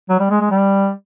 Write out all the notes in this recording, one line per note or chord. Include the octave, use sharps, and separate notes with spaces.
F#3
G3
G#3
G#3
G3